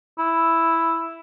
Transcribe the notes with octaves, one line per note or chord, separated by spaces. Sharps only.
E4